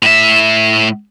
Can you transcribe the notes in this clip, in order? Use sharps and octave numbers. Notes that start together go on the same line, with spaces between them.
A2 E5